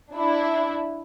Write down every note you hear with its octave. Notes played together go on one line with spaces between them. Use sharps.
D4 E4